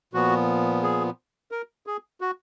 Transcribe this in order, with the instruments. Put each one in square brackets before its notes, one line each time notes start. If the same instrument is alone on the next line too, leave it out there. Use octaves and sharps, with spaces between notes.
[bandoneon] A#2 F3 B3 F#4
G#4
A#4
G#4
F#4